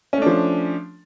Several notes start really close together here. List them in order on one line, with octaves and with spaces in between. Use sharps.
C#4 A3 D4 F3